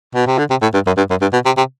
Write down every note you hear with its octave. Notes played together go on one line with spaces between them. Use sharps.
B2
C3
D3
C3
A2
G2
F#2
G2
F#2
G2
B2
C3
C3